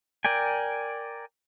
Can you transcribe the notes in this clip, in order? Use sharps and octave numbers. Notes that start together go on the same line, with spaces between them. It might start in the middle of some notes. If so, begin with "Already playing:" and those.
A#4 D5 G5 G#5